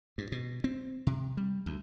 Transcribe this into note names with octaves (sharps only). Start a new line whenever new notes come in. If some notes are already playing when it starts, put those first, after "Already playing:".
G2
B2
C4
C3
G3
D2